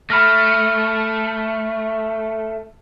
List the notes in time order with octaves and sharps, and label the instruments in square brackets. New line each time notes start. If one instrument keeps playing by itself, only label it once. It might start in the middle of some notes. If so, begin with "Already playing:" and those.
[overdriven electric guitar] A3 [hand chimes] B5 F6 A#6